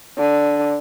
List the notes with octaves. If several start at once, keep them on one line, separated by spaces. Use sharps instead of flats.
D3